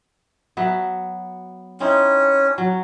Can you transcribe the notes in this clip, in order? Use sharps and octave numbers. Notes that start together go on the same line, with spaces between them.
F#3 B3 E5
C4 C#4 D#4 E4
F#3